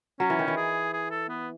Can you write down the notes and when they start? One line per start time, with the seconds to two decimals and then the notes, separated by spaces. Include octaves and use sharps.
0.19 F#3 C#4
0.30 E3
0.39 D#3
0.48 E3
0.57 G#4
0.93 G#4
1.11 A4
1.29 B3